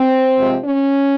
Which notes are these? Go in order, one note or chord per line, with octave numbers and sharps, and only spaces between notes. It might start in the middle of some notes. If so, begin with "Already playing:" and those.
Already playing: C4
C3 F3 G#3
C#4